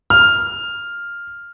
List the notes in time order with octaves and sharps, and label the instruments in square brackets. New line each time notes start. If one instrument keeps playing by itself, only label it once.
[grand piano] F6